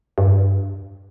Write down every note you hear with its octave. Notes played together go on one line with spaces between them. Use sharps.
G2